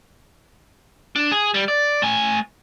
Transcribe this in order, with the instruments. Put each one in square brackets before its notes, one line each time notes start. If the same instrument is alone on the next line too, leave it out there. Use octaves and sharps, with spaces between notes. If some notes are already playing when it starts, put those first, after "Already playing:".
[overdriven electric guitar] D4
G#4
G3
D5
A3 G#5